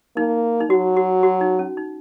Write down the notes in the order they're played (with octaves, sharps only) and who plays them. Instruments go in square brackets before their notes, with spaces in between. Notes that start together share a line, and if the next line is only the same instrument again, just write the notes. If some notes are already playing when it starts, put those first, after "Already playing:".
[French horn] A#3 [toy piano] D#4
[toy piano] D#4
[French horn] F#3 [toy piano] F#4
[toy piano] F#4
F#4
D#4
C#4
D#4